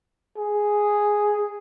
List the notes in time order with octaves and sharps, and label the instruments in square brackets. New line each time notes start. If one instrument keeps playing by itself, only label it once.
[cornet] G#4